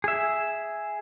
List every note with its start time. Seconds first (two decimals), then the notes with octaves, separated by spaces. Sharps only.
0.04 G#4 E5